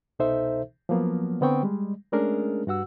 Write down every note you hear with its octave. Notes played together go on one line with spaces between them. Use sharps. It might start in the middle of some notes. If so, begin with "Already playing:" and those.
C2 B2 D#4 A4 C5 E5
F3 F#3 A#3 B3
D3 B3 C4 G5 C#6
G3 G#3
G#3 A3 C#4 D4 G#4 A#4
G2 F#4 F#5 E6